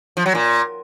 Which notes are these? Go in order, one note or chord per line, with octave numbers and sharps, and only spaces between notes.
F3
F#3
A#2